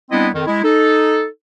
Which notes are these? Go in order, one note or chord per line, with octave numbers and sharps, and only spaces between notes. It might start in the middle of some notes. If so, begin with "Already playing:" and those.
G3 B3 C4 D4 E4 D#5
F2 D#3
G#3 E4
D#4 A4